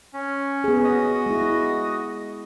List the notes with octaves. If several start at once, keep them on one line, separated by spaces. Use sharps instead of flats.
C#4
B3 G#4
F#4 D#5
G#3 E4